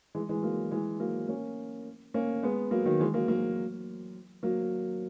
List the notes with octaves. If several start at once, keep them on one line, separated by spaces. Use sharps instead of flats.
E3 G#3
E3 G#3
F#3 A#3
E3 G#3
F#3 A#3
A#3 C#4
A#3 C#4
G#3 B3
F#3 A#3
D#3 F#3
E3 G#3
F#3 A#3
F#3 A#3
F#3 A#3